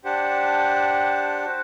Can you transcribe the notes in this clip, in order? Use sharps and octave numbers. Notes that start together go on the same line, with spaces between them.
D4 G4 C5 F#5 A5
F#4 C5